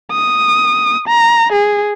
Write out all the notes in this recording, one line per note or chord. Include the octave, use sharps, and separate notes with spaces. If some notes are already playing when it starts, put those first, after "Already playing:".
D#6
A#5
G#4